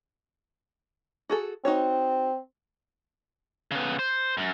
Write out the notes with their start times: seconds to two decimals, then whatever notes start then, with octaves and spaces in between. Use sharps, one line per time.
1.30 F#4 G#4 A4
1.65 C4 D#4 F#4 C#5
3.71 C#3 B3
3.99 C5
4.37 F#2